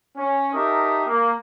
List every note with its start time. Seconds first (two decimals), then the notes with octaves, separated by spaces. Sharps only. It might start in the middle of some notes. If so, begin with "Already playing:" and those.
0.17 C#4
0.54 D#4 G4 A4 A#4 E5 D#6
1.06 A#3